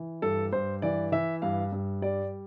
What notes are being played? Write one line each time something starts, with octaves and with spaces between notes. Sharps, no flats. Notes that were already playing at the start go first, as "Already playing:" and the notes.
Already playing: E3
G2 A4
G2 C5
E3 D5
E3 E5
G2 F5
G2
G3 D5